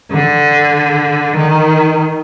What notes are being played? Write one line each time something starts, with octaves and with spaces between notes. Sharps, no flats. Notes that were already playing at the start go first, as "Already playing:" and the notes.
D3
D#3